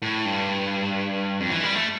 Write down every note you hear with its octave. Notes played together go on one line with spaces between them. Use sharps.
A2
G2
F2
E3
G3
A3